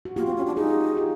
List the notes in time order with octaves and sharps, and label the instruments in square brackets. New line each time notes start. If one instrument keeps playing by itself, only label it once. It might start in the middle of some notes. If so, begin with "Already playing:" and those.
[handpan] F#4
[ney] A#3 [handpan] F4 G4
[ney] C4
C#4
D4
[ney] D#4 [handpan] F#4 G#4
[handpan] F4 G4